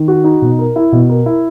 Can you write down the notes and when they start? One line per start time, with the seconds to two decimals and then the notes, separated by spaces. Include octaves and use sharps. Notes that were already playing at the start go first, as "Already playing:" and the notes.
Already playing: D#3
0.08 F#4
0.24 D#4
0.42 B2
0.59 A#4
0.76 E4
0.92 B2
1.09 A#4
1.26 E4